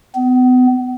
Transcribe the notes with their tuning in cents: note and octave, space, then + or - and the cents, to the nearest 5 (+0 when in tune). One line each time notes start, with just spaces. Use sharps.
B3 +35